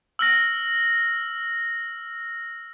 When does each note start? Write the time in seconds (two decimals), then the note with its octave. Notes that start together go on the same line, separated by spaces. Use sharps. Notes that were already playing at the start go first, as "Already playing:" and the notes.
0.19 E6 F6 A#6